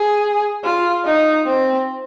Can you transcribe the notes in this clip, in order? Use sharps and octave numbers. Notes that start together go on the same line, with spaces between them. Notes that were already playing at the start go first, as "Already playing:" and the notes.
Already playing: G#4
F4
D#4
C4